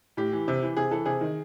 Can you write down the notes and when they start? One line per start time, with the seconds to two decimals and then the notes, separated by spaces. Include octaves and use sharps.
0.17 A2 G4
0.32 E3
0.48 C3
0.62 E3
0.77 C3 G#4
0.91 E3 A4
1.06 C3 G#4
1.21 D#3